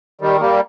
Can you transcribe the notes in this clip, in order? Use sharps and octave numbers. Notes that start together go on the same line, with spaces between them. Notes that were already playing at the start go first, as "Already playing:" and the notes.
D#3 G3
G3 A#3